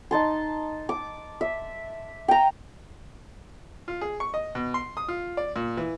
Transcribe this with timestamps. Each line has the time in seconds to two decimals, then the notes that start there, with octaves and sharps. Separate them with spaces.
0.11 D#4 A5 C6
0.89 D6
1.41 E5
2.28 G5 A#5
3.88 F4
4.01 G#4
4.20 C#6
4.34 D#5
4.55 B2
4.74 C6
4.97 D#6
5.08 F4
5.37 D5
5.56 A#2
5.77 E3